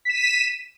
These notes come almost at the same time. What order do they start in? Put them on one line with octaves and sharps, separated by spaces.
B6 E7 D#7